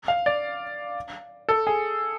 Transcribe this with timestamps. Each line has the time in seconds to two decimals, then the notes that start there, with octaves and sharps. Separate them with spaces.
0.08 F5
0.26 D5
1.49 A4
1.67 G#4